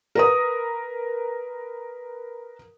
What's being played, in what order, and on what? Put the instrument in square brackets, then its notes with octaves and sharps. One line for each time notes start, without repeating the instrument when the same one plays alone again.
[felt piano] A#4 B4 D#6